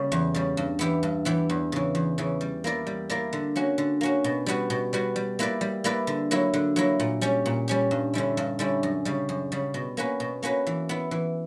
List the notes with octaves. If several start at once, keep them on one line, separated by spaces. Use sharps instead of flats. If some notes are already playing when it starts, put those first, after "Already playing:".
Already playing: C#3 G3 A#3 C#4
E2
C#3 G3
G2
E3 B3 E4 G4
G2
E3 B3 E4 G4
E2
C#3 E3
E2
C#3 E3
G3
A#3 E4 A#4 D5
G3
A#3 E4 A#4 D5
D3
A#3 C#4 F#4
D3
A#3 C#4 F#4
B2
G3 B3 F#4
B2
G3 B3 F#4
G3
A#3 E4 B4 D5
G3
A#3 E4 B4 D5
D3
F#3 A#3 E4
D3
F#3 A#3 E4
A#2
G3 C#4 G4
A#2
G3 C#4 G4
G2
D3 G3 C#4 E4
G2
D3 G3 C#4 E4
F#2
C#3 G3
F#2
C#3 G3
B2
A#3 C#4 F#4 B4
B2
A#3 C#4 F#4 B4
E3
B3 E4
E3